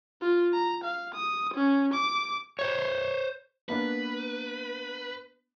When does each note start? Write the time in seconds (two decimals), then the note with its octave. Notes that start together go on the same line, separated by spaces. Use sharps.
0.21 F4
0.53 A#5
0.84 F5
1.14 D#6
1.54 C#4
1.94 D6
2.59 C5 C#5
3.69 A#3 B3 D4 B4